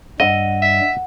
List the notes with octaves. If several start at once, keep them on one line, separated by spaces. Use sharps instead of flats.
G2 G3 D#5 F#5 E6
E5